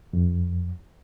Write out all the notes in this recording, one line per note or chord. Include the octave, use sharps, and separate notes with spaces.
F2